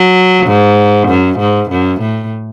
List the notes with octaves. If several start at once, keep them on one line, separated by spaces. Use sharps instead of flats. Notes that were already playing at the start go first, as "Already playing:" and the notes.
Already playing: F#3
G#2
F#2
G#2
F#2
A2